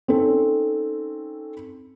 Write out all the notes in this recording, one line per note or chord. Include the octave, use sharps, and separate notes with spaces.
C4 C#4 D#4 A4